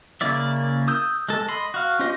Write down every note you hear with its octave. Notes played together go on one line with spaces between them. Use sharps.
C#3 A#3 E4 D5 E5
D#6 E6 G6
G#3 A4
D#5 B5 C6
F#4 F5
C#4 F4 G4 C5 D#5